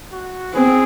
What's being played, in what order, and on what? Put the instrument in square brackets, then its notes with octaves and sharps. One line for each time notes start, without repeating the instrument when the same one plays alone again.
[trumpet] F#4
[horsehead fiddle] C4 [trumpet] G#4